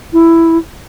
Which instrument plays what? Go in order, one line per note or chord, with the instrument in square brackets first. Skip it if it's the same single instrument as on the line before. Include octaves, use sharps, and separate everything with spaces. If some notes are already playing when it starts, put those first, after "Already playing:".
[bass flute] E4